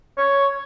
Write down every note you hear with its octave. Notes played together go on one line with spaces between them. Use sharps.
C#5